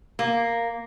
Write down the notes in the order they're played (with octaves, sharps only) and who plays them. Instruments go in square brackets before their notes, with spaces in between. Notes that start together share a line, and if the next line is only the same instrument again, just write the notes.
[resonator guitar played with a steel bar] A#3